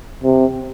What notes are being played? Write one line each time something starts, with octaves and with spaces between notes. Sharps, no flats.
C3